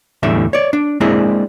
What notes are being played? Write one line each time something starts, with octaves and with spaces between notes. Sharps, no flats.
E2 A2 D3 G3 E5
C#5 D5
D4
G#3 A#3 C4 D4 E4 G#4